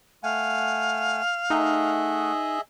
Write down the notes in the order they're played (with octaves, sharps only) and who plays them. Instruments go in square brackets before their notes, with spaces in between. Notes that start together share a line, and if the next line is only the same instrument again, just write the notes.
[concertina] A3 F#5 G#5 [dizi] F5
[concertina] A3 F#5 [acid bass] D#4 [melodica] G#4 D#5 E5